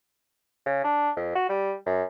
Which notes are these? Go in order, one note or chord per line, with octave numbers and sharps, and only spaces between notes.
C#3
D4
F2
F#4
G3
F#2